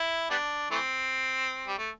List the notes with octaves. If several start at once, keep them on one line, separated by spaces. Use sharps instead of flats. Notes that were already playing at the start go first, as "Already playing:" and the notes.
Already playing: E4
G3 B3 D4
E3 A3 C4
G3
A3